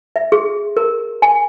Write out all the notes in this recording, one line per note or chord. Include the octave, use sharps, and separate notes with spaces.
E5
G#4
A#4
G#5